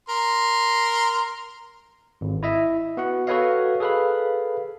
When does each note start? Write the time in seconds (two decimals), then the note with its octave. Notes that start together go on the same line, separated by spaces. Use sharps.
0.09 A#4 C6
2.21 G#1
2.43 E4 D#5 E5
2.97 B3 F#4 F#5
3.27 F#4 A4 B4 C#5 D#5 F5
3.80 G#4 A4 B4 F5 B5